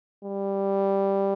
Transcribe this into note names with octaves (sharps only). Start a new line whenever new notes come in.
G3